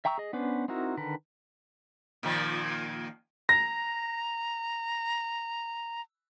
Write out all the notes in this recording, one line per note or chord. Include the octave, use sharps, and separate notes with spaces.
E5 G5 A#5 C#6 E6
G#4 D#5
B3 C#4 D4 B4 C5
C4 D#4 E4 F#4 A#4
D3 D#3 A#4 B4
A#2 D#3 F3
A#5 A#6